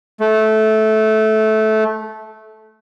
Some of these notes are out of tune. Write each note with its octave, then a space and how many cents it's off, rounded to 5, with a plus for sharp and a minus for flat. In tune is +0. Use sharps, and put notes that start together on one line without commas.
A3 -15